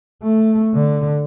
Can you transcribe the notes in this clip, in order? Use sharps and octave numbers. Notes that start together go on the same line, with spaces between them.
A3
D3